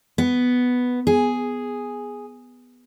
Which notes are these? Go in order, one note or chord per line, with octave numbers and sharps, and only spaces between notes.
B3
G#4